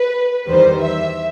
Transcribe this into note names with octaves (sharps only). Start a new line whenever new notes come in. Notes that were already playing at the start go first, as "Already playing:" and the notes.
Already playing: B4
E2 D#3 G3 C5
E5